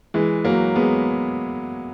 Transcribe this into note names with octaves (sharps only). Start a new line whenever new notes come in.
E3 G#3
F#3 A#3
G#3 B3